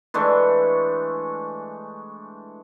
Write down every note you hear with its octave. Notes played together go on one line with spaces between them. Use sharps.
E3 G#3 A3 D4